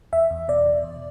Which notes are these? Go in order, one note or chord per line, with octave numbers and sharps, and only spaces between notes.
E2 E5
E2
B2 D5
B2
E2